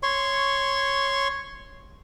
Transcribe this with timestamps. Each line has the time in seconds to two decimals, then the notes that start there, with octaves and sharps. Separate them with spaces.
0.03 C#5 C6 C#6